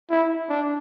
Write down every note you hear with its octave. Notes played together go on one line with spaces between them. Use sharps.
E4
D4